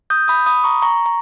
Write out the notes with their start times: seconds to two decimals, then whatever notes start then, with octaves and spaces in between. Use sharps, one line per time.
0.10 D#6 G6
0.28 B5 D#6
0.46 B5 D#6
0.64 A#5 C#6
0.82 A#5 C#6
1.06 A#5